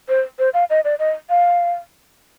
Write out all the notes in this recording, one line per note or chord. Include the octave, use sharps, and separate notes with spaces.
C5
C5
F5
D#5
D5
D#5
F5